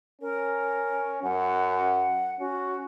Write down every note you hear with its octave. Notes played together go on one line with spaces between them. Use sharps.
C#4 A#4
F#2 F#5
C#4 F#4